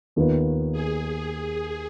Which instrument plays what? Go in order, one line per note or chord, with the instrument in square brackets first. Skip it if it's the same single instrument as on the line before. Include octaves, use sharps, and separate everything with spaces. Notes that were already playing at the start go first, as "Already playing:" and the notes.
[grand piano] D#2 D#3 B3 F4 B4
[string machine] G#4
G#4